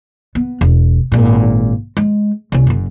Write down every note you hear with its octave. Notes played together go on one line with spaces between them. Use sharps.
B3
E1
G#1 A#2
G#3
C2 C#4
F#1 F#2